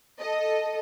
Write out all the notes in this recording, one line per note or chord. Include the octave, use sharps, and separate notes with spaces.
A4 D#5